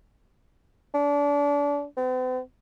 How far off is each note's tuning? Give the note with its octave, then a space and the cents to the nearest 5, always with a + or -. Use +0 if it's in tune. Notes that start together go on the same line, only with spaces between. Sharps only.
D4 -30
C4 -45